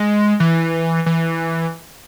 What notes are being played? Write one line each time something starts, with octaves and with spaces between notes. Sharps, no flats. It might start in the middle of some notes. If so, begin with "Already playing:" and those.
Already playing: G#3
E3
E3